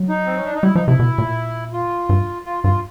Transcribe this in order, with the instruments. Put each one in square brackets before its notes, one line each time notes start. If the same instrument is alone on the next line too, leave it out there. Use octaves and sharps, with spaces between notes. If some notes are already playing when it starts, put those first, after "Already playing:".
Already playing: [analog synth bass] F#3
[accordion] D#4
C4
C#4
D4
D#4
[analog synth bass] G3 [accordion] E4
[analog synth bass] F3 [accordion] D#4
[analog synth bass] C3 [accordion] E4
[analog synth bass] B2
A#2
[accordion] F4
[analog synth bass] G2
[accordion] F4
[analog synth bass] G2 [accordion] F4